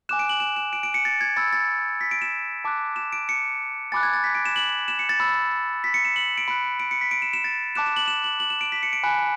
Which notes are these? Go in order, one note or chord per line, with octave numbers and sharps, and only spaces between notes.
G#5 D6 F#6 E7
D7
F#7
E7
E7
D7
D7
C#7
A6
G#6
B5 E6 A6
A6
B6
D7
E7
A5 D6 F#6
E7
D7
C#7
G#5 B5 D6 F#6 A6
G#6
A6
B6
D7
E7
F#7
E7
C#7
A6
B5 E6
B6
C#7
E7
F#7
D7
B5 F#6 D7
D7
C#7
B6
D7
E7
E7
A6
A5 D6 F#6 E7
E7
F#7
E7
F#7
F#7
E7
D7
B6
C#7
D7
G#5 B5 F#6